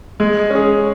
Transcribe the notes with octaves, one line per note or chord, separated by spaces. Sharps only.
G#3
C#4 G#4